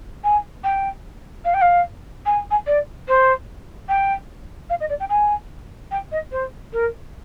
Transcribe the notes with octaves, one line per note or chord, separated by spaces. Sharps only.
G#5
G5
F5
G5
F5
G#5
G#5
D5
C5
G5
F5
D#5
D5
G5
G#5
G5
D#5
C5
A#4